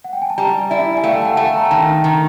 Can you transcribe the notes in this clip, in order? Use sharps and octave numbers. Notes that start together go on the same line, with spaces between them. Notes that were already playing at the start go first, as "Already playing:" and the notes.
F#5
G5
G#5
A5
G3 G#5 A#5
E4 D5 E5
G#5
A3 F5 G5
A5
F#5 G#5
A3
A5
A#5
G5 A5
D#3
D#3